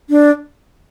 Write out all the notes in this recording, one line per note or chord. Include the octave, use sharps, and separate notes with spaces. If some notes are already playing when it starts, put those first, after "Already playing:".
D4